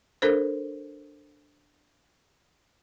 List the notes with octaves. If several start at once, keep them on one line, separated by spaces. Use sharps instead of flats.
D4 A4 A#4 C5